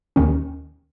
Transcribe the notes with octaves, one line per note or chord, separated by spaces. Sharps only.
D#2 D#3 C#4